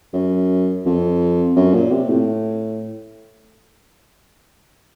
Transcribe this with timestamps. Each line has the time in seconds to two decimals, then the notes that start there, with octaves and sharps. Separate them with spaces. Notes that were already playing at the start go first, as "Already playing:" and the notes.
0.13 F#2
0.85 F2
1.56 F#2
1.74 A#2
1.91 C3
2.09 A2